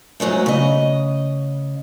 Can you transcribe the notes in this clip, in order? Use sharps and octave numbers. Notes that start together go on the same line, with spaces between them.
G#2 F#3 G#3 A3
C#3 D#5